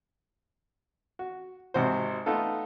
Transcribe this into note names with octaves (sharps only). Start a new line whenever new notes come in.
F#4
G#1 C3 F#4 C5
A3 B3 D#4 F4 A4